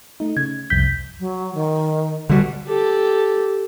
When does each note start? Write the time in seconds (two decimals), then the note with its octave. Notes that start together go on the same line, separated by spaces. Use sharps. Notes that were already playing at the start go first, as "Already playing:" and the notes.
0.20 A3 D#4
0.37 C#3 G#6
0.70 C2 F2 G6 B6
1.19 F#3
1.55 D#3
2.30 D3 G3 F#4
2.67 G4 A4